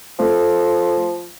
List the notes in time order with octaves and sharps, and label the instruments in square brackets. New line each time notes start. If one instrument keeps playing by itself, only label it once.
[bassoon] F3 [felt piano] A3